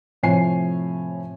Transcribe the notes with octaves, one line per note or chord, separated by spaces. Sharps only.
A2 C3 F3 C#5 G#5 C7